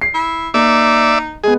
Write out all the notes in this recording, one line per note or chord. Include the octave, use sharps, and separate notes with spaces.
C7
E4
A#3 D#4 D5 E5
G#3 B3 G#4